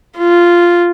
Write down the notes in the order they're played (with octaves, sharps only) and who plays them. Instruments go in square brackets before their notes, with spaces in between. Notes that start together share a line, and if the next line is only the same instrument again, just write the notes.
[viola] F4